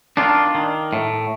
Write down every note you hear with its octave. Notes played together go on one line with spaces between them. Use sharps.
D#3 D4 F4
D#3
A2